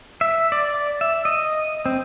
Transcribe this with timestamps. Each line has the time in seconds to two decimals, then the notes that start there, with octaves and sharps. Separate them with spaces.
0.21 E5
0.52 D5
1.01 E5
1.25 D#5
1.86 C4